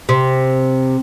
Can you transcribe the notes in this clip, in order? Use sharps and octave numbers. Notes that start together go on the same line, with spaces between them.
C3